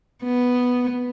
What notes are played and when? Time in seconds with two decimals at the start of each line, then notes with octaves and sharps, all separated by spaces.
0.24 B3